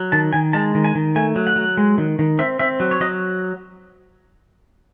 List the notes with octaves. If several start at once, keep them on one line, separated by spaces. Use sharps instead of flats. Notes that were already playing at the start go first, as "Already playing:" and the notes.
Already playing: F#3
D#3 A5
D#3 G#5
G#3 A5
D#3
G#5
D#3
A3 G#5
F#3
F#5
F#3
G#3
D#3
D#3
C4 E5
C4 E5
F#3
C#5
F#3 D#5